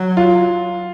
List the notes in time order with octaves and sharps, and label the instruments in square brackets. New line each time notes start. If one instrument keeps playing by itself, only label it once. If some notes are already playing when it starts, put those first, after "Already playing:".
Already playing: [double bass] F#3
[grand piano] F4